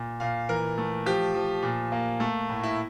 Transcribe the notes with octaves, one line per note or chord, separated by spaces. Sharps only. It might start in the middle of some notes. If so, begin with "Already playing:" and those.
Already playing: A#2
A#2 F5
E3 A#4
A3
F3 G4
F3
A#2
A#3
A3
A2
E4